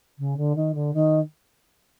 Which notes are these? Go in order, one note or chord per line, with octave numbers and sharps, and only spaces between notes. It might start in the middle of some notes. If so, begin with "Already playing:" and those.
C#3
D3
D#3
D3
D#3